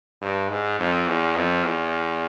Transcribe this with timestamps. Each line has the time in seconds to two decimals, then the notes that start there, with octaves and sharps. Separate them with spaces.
0.22 G2
0.50 G#2
0.79 F2
1.07 E2
1.36 F2
1.64 E2